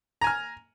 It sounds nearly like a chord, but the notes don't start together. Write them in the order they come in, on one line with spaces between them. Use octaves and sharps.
A#5 G#5 F6